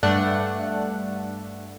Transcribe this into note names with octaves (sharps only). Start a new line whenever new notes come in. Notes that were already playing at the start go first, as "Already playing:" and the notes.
G2 A3 D4 F#5